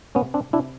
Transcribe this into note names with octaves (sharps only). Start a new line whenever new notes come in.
C3 B3 C#4
C4 D4
C3 D4 E4